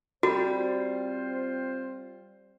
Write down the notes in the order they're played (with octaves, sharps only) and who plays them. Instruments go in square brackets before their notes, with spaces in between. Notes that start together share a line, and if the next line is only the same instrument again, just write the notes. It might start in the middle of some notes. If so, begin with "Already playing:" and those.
[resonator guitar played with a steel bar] G3 [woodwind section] C4 F4 C5 [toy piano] F#4